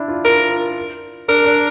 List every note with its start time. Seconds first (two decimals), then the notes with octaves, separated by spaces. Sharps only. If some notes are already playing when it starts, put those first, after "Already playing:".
Already playing: D4 E4
0.08 F4
0.25 F4 A#4
1.28 D4 A#4
1.45 D4